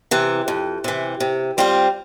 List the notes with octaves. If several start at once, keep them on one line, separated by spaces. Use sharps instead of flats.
C3 E3
F2
C3 E3
C3
G3 C4 F4 C5